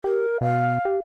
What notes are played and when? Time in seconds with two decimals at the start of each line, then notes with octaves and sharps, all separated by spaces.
0.04 G4 A#4
0.41 B2 F5
0.85 G4